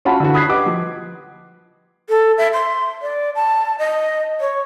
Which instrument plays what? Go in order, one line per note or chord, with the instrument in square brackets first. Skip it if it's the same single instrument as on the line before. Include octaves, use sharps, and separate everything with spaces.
[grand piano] C#4 F4 F#4 F#5 A5 B5
D3 E3 F#4
B5 D#6 F#6 G#6 B6 C7
G4 B4 D#5 F#5 D6
F3
[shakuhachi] A4
E5
C6
D5
A5
D#5
C#5